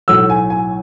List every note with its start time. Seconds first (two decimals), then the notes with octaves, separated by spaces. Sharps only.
0.08 B1 A2 F#3 A3 E6
0.30 G#5
0.50 G#5